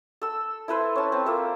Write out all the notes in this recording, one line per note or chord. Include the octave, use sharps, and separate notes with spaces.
A4 E6
E4 A4 B4 C5
C#4 A5
C4
A#3 F4 A4 E5